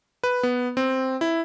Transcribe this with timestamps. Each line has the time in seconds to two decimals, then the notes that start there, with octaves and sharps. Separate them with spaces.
0.24 B4
0.43 B3
0.77 C4
1.21 E4